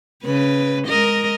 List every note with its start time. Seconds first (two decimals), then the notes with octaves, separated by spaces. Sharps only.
0.24 C#3 B4
0.87 G#3 A#4 D#5